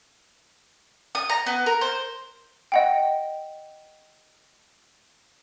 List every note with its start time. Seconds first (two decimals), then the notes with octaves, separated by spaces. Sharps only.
1.15 D#6
1.29 A#5
1.46 B3
1.66 A#4
1.81 C5
2.72 D#5 F#5 G5